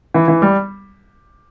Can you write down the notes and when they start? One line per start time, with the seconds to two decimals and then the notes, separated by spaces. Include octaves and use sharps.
0.14 E3
0.28 E3
0.42 G3